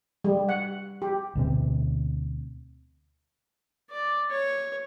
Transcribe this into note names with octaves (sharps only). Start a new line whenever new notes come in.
G3
F#5
G4
D2 B2 C4
D5
C#5